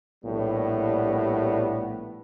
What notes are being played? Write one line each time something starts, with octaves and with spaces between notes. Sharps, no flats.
A#1 A2 G3 B3